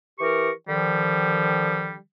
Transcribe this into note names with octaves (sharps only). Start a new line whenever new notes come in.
E3 G4 A#4 C#6
D3 D#3 F3 G3